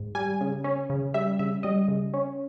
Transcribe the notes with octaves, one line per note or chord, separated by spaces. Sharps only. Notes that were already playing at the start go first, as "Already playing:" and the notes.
Already playing: G#2 D#3
G3 G#5
C#3
C#4
C#3
G3 E5
C#3 E5
G3 D#5
C#3
C#4